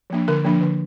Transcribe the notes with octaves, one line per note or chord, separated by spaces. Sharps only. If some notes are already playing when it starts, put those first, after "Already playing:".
F3 A#3 D4
D3 A#4
F3 A#3 D4
D3